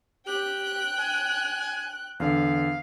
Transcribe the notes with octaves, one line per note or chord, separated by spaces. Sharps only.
G4 G5 F#6
G#5
E2 D3 F5